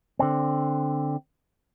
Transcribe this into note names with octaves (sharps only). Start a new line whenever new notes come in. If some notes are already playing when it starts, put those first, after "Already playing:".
D3 C4